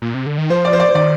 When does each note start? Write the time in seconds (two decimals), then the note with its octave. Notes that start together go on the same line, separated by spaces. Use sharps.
0.02 A#2
0.14 C3
0.26 D3
0.38 D#3
0.50 F3 C5
0.65 D5
0.73 C5
0.80 D5
0.89 C5
0.95 D#3 D5